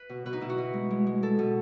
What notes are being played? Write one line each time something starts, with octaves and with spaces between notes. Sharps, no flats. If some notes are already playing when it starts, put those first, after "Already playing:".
Already playing: B4
B2
B2 B4
D#4
B2 E4
F#4
B2
G#3
G#3
G#3
G#3 A4
B2